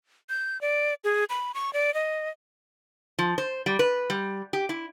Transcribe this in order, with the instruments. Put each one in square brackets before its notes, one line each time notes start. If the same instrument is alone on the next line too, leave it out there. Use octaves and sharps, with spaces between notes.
[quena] G6
D5
G#4
B5
C#6
D5
D#5
[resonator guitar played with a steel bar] F3
C5
G3
B4
G3
G4
E4